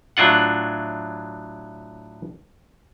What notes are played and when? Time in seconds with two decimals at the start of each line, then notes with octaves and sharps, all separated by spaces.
0.17 A2 F#3 D4 F4 F#5